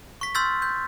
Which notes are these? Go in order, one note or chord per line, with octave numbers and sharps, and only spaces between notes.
C#6 B6
C6 E6 F6 G6 A6 B6
G6